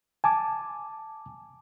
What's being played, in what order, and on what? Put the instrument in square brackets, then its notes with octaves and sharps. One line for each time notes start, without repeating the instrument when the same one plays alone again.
[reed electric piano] G#5 A5 D6